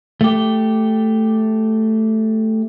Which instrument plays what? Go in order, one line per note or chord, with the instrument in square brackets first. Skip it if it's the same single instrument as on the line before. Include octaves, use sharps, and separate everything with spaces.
[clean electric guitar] A3 G4